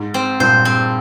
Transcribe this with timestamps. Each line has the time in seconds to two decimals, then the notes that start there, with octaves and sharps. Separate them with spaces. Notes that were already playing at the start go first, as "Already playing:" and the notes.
Already playing: G#2
0.14 C4
0.40 G2 A#2 C5
0.65 C4